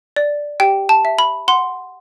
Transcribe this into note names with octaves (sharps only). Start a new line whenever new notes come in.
D5
G4 G5
A5
E5
B5
F#5 C6